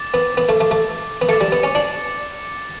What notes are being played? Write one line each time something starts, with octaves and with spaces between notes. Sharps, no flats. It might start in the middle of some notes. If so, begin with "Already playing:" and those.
Already playing: D6 A6
B3
B3
A3
A3
A3
B3
A3 D6 A6 C#7
G3
B3
C#4
D4